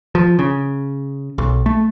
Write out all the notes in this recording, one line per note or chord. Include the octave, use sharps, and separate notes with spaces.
F3
C#3
B1
A3